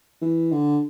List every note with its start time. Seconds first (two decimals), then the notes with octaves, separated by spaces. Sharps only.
0.22 E3
0.52 D3